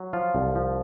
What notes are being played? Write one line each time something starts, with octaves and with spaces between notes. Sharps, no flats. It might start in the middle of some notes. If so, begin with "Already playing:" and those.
Already playing: F#3
F3 F4
C2
F3